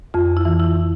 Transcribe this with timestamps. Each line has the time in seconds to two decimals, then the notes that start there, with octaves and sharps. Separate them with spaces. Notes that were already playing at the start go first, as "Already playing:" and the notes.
0.14 F2 F4
0.37 E4
0.45 E3
0.60 E4